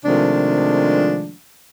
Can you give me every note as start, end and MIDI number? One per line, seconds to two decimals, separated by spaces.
0.04 1.33 48
0.04 1.33 51
0.04 1.33 53
0.04 1.33 56
0.04 1.33 57
0.04 1.33 62